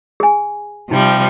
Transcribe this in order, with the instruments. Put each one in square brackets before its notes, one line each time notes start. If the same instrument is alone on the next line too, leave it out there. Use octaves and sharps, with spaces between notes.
[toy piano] G#4 G#5
[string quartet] C3 F3 G3 [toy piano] D#4